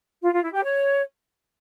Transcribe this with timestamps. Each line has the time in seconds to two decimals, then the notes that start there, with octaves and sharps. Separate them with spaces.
0.22 F4
0.32 F4
0.43 E4
0.53 G4
0.64 C#5